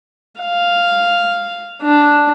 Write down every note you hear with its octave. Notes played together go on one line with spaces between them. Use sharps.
F5
D4